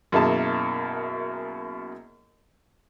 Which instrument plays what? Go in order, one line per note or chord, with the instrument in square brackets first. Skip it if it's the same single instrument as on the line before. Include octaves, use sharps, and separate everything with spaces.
[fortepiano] F#2 B2 A#3 E4 G#4 A5